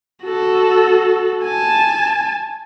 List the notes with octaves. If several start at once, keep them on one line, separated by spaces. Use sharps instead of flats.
F#4 A4
G#5 A5